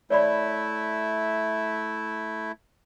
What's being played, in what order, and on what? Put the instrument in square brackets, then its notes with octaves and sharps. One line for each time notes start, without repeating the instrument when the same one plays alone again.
[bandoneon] A3 E4 [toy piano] C#5 D5 B5